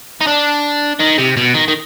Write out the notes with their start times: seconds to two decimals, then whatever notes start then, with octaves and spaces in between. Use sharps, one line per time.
0.21 D#4
0.27 D4
1.00 D#3
1.18 C3
1.37 B2
1.54 D#3
1.68 D#3